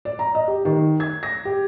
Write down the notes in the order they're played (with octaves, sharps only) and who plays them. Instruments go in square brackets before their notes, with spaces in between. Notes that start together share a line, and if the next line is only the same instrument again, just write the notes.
[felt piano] D5
A#5
D#5
G4
D#3
G#6
A#6
G4